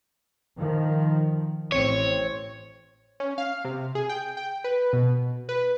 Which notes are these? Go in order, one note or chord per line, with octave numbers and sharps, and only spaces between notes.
D#3 F3
A1 C4 C#5
C#4
F5
C3
G#4
G5
G5
B4
B2
B4